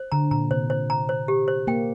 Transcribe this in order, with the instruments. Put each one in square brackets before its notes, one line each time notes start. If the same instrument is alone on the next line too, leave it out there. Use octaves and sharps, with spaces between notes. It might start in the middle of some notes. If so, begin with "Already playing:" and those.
Already playing: [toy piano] C5
[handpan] D3 [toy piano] A#5
[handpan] A#2 [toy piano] A#5
[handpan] C3 [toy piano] C5
[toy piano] C5
A#5
C5
G4
C5
[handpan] A#3 [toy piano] G5